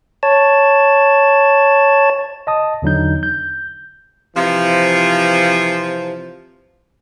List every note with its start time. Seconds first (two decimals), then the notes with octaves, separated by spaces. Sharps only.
0.23 C#5 A5
2.47 D#5 A5 D#6
2.82 E2 D3 F#3 D4 D#4 G6
3.23 G6
4.36 C3 E3 F3